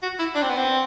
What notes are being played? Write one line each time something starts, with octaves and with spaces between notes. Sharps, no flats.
F#4
E4
D4
C4
B3
C4